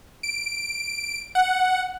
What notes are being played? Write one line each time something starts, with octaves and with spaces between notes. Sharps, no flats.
D7
F#5